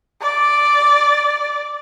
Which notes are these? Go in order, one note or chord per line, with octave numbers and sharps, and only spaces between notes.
D5